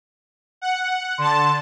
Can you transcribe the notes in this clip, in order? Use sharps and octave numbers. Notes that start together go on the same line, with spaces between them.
F#5
D3 A5 C6